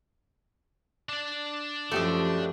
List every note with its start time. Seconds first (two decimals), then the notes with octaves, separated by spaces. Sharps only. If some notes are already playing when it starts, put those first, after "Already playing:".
1.09 D4 D5
1.91 F#2 F3 A3 G4 D#5